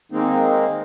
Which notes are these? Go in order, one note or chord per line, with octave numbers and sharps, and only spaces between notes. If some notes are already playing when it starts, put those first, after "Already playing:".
D#3 G#3 A#3 C4 D#4